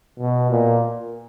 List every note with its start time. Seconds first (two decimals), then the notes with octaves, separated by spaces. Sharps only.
0.19 B2
0.51 A#2